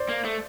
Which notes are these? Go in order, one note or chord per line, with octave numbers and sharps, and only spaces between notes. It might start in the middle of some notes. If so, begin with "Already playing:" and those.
Already playing: C5 D5
A#3
A3